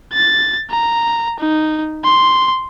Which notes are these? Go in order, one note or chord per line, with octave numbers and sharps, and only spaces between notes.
A6
A#5
D#4
C6